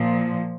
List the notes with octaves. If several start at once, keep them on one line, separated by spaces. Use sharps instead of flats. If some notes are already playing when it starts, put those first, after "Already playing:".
Already playing: A#2 F3